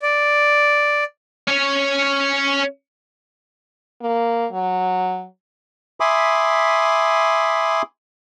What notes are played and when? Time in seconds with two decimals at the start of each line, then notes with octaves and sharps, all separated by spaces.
0.02 D5
1.47 C#4 C#5
4.01 A#3
4.52 F#3
6.00 E5 G#5 B5 C6 D6 D#6